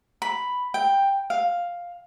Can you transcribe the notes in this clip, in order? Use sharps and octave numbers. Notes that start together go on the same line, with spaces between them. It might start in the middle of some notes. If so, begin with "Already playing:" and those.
B5
G5
F5